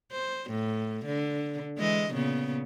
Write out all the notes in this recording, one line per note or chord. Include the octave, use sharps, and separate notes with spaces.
C5
A2
D3
E3 G#3 D#5
A#2 C#3 B3